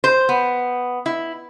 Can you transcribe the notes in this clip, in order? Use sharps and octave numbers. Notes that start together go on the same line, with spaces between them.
C5
B3
E4